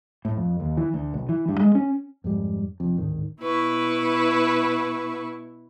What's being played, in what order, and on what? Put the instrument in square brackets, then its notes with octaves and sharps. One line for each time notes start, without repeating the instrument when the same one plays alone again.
[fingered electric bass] A2
F2
D#2
E3
D2
B1
E3
G2
G#3
C#4
F2 G#2 G3
F1 F2
D1 G#1 D#3
[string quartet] B2 E4 B4 C#6